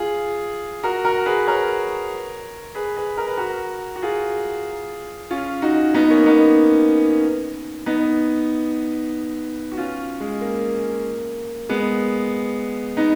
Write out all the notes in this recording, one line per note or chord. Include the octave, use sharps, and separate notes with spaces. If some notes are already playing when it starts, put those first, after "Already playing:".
Already playing: F4 G#4
F#4 A#4
F#4 A#4
G#4 B4
A#4 C#5
G#4 B4
G#4 B4
A#4
B4
F#4 A#4
F#4
F4 G#4
C#4 F4
D#4 F#4
B3 D#4
A#3 C#4
B3 D#4
B3 D#4
F#4
C#4 F4
G#3
A#3
G#3 B3
B3 D#4